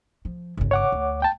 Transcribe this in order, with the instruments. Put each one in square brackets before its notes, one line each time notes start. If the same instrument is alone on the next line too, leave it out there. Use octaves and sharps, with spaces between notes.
[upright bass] F3
G1 C#3
[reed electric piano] C#5 F#5 D6
[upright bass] D2
[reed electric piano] G5 A5